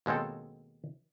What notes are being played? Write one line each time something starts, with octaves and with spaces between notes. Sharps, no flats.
D#2 B2 G#3 C4 A4